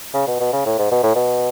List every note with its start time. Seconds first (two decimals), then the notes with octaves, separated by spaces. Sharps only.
0.14 C#3
0.27 B2
0.40 B2
0.53 C#3
0.66 A2
0.79 G#2
0.92 B2
1.03 A2
1.15 B2